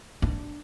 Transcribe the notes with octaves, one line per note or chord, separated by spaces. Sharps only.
D4